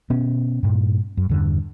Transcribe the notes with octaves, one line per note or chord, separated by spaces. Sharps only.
B2 B3 C#4
G2 A#2
F#2
E2 G2 D3